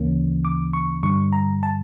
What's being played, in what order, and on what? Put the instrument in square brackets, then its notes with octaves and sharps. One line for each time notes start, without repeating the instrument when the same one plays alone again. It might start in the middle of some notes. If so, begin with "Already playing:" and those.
Already playing: [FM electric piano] D2 C#3 E3 A#3 C#4
D6
C#6
G2 D3 G3 C#6
A#5
A5